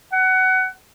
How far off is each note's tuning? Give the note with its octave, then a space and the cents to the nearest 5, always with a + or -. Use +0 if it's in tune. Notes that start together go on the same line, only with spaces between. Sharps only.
F#5 +20